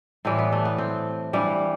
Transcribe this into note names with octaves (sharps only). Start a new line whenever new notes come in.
A2 E3 G3 C4
B3
A3
B3
C4
G2 E3 G3